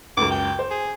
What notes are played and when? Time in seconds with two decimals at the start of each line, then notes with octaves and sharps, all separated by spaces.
0.17 C#2 F#2 D6
0.31 G5
0.59 C5
0.71 G#4